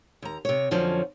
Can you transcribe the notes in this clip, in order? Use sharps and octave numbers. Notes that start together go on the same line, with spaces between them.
D#2 A#5
C3 C#5
F2 D3 F3 F#3 C#4